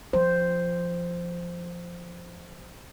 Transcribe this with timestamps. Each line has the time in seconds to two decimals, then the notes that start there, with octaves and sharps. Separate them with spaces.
0.13 F3 C5